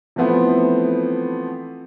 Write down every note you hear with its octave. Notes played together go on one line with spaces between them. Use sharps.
E3 F3 A3 B3 C4